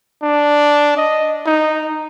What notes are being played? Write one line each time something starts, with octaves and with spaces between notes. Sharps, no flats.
D4
D#5
D#4